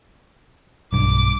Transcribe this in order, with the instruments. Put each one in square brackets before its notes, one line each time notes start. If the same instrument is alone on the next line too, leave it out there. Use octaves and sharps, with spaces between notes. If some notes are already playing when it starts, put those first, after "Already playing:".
[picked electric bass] B1 G2 [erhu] D6